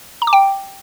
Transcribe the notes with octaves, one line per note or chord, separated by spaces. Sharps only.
A#5
D6
G5